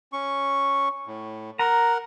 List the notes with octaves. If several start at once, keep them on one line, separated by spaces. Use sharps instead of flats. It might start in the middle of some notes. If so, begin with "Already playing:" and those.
C#4 C#6
A2
A#4 F#5 A#5